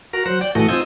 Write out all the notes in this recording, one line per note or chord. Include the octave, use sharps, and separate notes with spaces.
F#4 A#4 A#5
F#3 C5 F#5
D5 G5
A2 E3 A3 F#4 A4 D#6
C4 D#4 F4 G#5 D#6 E6